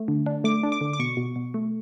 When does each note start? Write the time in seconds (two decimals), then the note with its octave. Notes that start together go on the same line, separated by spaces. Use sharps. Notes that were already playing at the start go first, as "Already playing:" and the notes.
Already playing: A3
0.08 D3
0.26 D4
0.44 A3 D6
0.63 D4
0.72 D6
0.81 D3
0.93 D6
0.99 B2 C#6
1.17 B2
1.36 B2
1.54 A3